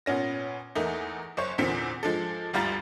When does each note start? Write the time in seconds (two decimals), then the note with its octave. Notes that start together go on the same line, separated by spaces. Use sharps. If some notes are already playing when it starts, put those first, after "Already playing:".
0.06 A#2 B3 C#4 A#6
0.75 E2 A3 A#3 D#4
1.37 F#1 C5 C#5
1.58 E2 A#2 D3 C4 B6 C#7
2.03 F3 G#3 D4 A4
2.53 G1 D2 G3 F4 A#5 A6